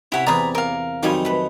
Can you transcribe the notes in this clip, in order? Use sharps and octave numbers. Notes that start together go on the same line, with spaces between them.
C3 C#4 E4 F#5 B5
E2 C3 G#4 D5 A#5 B5 D#6
A#4 F5
F2 D#3 F#3 G3 D#4 G#5
A3 B4